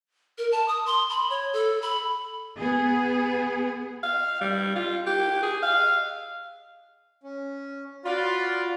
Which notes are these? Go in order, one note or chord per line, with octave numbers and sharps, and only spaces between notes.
A#4
A5
D#6
C6
B5
C#5
A4
B5
B3 G#4
F5
G3
F4
G4
G#4
F5
C#4
F4 F#4 D5 B5